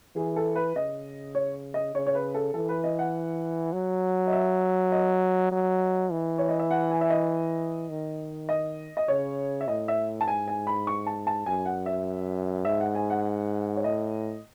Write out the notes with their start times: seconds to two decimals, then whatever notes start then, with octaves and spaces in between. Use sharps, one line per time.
0.16 E3 G#4
0.36 A4
0.55 B4
0.75 C#3 D#5
1.35 C#5
1.74 D#5
1.95 C#3 C#5
2.07 C#5
2.15 B4
2.34 A4
2.54 E3 A4
2.69 B4
2.84 D#5
2.99 F#5
3.73 F#3
4.27 D#5
4.32 E5
4.92 D#5
5.51 F#3
6.11 E3
6.38 C#5
6.49 D#5
6.59 E5
6.71 F#5
6.90 G#5
7.01 E5
7.10 D#5
7.89 D#3
8.49 D#5
8.97 D#5
9.08 C#3 C#5
9.61 E5
9.68 A2 D#5
9.88 E5
10.21 A5
10.27 G#2 G#5
10.48 G#5
10.67 B5
10.87 C#6
11.07 A5
11.27 A5
11.46 F#2 G#5
11.66 F#5
11.86 E5
12.65 G#2 E5
12.81 F#5
12.95 G#5
13.10 F#5
13.76 C#5
13.84 A2 D#5